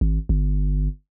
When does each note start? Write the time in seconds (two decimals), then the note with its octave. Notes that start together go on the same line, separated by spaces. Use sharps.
0.01 G#1
0.29 G1